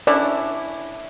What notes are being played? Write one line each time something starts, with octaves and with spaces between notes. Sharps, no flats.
C#4 D4 E4 D5